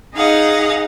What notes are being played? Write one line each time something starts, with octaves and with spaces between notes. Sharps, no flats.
D#4 G#4 D#5 F5 F#5